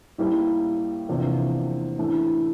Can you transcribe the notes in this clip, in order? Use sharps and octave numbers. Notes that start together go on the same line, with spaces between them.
A2 G3 A#3 E4 A#4
E2 C3 F3 A#3 D4
A2 E3 A3 D4